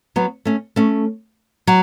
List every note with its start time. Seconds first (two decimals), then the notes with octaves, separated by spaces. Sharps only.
0.16 F#3 B3
0.45 A3 C#4
0.76 A3 C#4
1.67 F#3